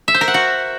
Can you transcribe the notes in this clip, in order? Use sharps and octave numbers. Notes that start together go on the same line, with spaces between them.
E5
C5
A#4
F#5
F#4